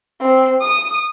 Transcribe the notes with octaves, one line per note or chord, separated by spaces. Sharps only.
C4
D#6